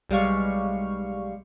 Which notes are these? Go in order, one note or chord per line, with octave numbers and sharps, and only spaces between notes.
B1 G3 G#3 F5 C#6